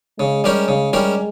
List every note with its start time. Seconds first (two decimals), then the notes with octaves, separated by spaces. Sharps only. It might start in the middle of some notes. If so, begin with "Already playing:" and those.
0.20 C#3 G#3
0.44 G3 C#4 G4 A#4
0.68 C#3
0.93 G3 C#4 G4 A#4